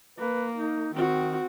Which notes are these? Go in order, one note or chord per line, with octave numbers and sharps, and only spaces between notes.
A#3 B4
D#4
D#3 C4 F#4